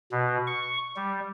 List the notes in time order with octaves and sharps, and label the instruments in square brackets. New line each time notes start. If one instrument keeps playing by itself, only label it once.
[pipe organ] B2
C#6
G3